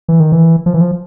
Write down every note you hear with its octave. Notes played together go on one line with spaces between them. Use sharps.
E3
D#3
E3
F3
E3
F3